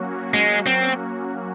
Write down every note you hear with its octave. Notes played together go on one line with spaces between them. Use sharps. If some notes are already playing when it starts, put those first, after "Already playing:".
Already playing: F#3 A#3 C#4 F#4
G#3
C4